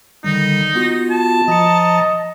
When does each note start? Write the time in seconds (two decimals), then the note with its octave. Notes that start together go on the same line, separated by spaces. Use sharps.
0.24 D3 D#3 G3 D#4
0.75 B3 F4 F#4
1.10 A5
1.48 F3 D#5 A#5 C#7